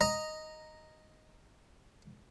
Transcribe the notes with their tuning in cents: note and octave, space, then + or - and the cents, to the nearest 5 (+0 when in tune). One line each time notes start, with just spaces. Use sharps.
D#5 +0 A#5 -5